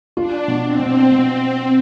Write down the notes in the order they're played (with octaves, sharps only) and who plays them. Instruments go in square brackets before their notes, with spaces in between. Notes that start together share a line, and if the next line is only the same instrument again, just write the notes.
[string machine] D4 [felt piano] F4
[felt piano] B2
[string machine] C4
[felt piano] B2
B2